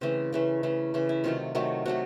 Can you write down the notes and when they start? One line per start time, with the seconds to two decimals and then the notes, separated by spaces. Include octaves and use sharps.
0.01 C#3 E3 A3 C4
0.33 C#3 E3 A3
0.63 C#3 E3 A3
0.94 C#3 E3 A3
1.09 E4
1.24 C3 D#3 F#3 A3 F4
1.55 C3 D#3 F#3 A3
1.86 C3 D#3 F#3 A3 F#4